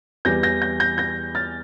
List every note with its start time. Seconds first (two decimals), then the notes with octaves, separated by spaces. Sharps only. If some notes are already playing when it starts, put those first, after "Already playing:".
0.25 E2 E3 G3 G6 A#6
0.43 G6 A#6
0.62 G6 A#6
0.80 G6 A#6
0.98 G6 A#6
1.35 F6 A6